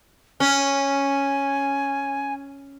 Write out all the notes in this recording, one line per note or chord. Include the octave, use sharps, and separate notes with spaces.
C#4 G#5